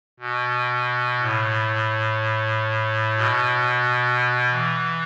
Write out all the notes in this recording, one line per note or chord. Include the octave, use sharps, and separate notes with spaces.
B2
A2
B2
E3